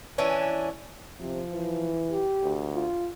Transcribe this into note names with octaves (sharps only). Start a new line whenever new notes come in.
E3 C#4 D4
C3 F3
E3
G4
D2
F4